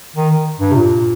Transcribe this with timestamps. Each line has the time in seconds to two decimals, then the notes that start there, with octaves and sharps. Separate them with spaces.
0.16 D#3
0.60 G2
0.71 C3
0.74 A#2